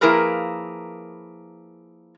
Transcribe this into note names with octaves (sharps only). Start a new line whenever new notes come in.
F3 A#3 E4 G#4 A#4 B4